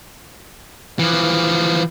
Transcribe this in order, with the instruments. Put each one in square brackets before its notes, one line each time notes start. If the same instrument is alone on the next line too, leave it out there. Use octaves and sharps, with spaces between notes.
[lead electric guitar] E3 F3